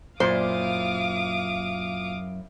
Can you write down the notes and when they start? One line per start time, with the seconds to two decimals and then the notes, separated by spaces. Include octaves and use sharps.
0.20 F#2 A#2 E4 C5 F5 D6 D#6